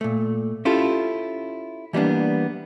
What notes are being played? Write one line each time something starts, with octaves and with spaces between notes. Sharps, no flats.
A#2 A3
C#4 E4 F4 G4 A4
E3 G3 A#3 B3 D4